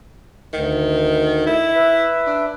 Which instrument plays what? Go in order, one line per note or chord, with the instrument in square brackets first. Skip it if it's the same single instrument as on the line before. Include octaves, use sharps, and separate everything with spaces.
[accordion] D2 [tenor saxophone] D#3
[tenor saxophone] E4
[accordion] B4 E5
[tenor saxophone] D4